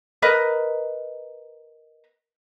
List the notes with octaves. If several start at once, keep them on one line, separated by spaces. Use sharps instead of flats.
A#4 B4 D#5